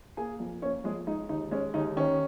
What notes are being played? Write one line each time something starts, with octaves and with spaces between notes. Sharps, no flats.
A#3 G#4 G#5
F2
A#3 C#4 C#5
F2 G#3 G#4
G#3 D#4
D#2 D#4
G#3 C#4
D#2 D#4
D#3 C#4